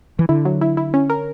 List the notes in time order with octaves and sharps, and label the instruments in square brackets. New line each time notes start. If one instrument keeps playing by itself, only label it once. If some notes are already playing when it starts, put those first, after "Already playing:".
[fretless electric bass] E3
[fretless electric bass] D3 [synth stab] E4
[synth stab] F#3
E4
E4
C#4
A#4